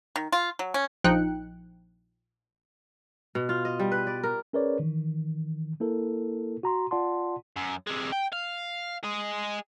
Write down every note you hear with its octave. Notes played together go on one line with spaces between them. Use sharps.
D#3
F4
F#3
C#4
A#1 F3 D#4 G5 F#6 C#7
B2
F4
D#5
G3
B4
D5
A#4
C#4 G#4 A#4 B4 C#5 D5
D#3 E3
A#3 E4 A4 A#4
F#4 A#5 C6
F4 D5 F#5 A5 C6
F#2
C3 G#3
G5
F5
G#4 D#5